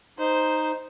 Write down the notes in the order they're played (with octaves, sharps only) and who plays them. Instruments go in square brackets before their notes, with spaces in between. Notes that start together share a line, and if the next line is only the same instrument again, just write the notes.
[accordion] D#4 [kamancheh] C5